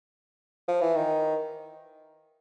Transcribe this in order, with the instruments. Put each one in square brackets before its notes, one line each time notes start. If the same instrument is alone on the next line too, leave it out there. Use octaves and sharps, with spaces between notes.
[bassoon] F3
E3
D#3